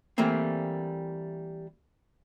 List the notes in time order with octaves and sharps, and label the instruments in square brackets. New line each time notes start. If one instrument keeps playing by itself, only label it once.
[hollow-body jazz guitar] E3 G3 A3 A#3 C4